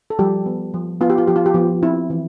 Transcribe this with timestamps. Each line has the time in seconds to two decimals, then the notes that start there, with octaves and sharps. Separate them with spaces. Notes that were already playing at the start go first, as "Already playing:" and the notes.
0.10 A4
0.19 F3 G3 G4
0.46 B3
0.74 F3
1.01 B3 F4
1.10 G4
1.18 F4
1.28 F3 G4
1.36 F4
1.46 G4
1.54 F3 B3 F4
1.83 C4 E4
2.10 E3